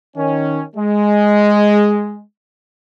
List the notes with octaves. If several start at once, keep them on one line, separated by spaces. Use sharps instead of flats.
D#3 C#4
G#3